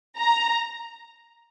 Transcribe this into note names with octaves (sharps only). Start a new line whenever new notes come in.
A#5